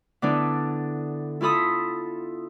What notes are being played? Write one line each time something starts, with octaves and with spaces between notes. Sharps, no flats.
D3 B3 D4 E4
E4 F4 A4 B5 D#6